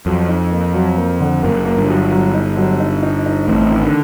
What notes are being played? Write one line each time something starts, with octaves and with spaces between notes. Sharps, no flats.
F2 F#3
D#4
A#3
F#3
A#3
D3
F#1 F#2 A#3
A#3
G1 G2
F#3
F#3
D#4
F#3
D#4
D#4
D#4
A1 A2 C4
D#3
D3